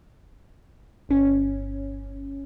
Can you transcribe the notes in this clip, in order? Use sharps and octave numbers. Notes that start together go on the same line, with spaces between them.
G1 C#4